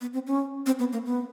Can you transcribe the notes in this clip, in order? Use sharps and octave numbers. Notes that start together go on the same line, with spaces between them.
B3
C4
C#4
C4
B3
A#3
B3